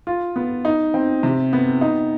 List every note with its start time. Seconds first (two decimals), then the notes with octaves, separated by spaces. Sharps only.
0.07 F4
0.36 B3
0.65 D#4
0.94 C4
1.23 C3
1.53 B3
1.81 D#4